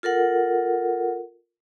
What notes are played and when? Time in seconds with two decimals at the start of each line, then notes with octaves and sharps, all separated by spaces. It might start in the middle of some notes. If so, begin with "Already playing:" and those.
0.03 F4 A4 A#4 F#5